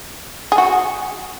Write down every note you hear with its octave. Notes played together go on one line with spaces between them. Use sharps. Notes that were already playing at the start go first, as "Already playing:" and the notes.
G#4
F#4